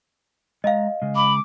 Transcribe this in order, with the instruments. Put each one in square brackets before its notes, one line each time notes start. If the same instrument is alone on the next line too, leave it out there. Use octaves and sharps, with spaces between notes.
[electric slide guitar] G#3 A#5 [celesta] D#5 F5
[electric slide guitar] C#3 G#3
[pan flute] B5 [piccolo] D6